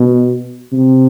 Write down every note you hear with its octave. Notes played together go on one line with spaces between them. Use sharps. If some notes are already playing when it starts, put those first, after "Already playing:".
Already playing: B2
C3